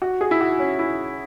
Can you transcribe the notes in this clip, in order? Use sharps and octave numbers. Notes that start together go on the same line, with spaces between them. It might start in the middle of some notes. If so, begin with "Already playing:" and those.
F#4
G#4
E4
F#4
C#4
E4